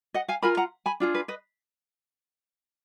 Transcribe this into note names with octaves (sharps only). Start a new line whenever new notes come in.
D#5 F#5
F5 G#5
F4 A#4 G#5 B5
F#5 A#5
G#5 B5
D4 F4 G#4
B4
B4 D#5